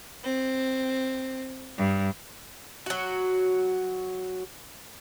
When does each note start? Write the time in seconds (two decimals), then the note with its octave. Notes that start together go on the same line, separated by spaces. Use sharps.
0.23 C4
1.77 G2
2.86 F#3 F#4